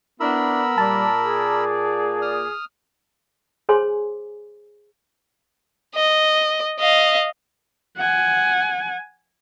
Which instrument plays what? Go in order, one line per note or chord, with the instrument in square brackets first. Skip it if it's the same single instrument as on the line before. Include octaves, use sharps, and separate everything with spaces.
[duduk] B3 [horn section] D4 E4 [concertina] A#4 B5 E6
[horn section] A#2 D5 [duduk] G3 [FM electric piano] A5
[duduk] G#4
[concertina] D#6 F6
[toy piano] G#4 C5 C#5 G#5 C6 D6
[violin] D#5
D#5 F5
[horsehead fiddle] F#5 G#5